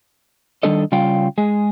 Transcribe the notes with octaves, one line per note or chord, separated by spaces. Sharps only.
D#3 E3 G3 D4 A4 D#5
C#3 G3 F4 F5 G5
G#3 G#4